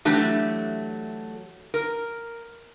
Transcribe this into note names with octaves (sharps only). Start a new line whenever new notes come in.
E3 F#3 A3 D4 G4
A#4